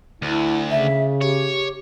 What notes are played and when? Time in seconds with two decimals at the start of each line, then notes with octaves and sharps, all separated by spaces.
0.22 D2 E4
0.71 C#3 E5
1.21 G4 C#5